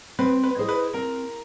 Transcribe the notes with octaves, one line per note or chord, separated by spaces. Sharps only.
C4 B4
B4
E4 G#4 C5 D#5
B4
C4 A#4